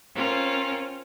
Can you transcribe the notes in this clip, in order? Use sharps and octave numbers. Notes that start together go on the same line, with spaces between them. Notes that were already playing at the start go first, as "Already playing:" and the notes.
C4 C#4 F4 A#4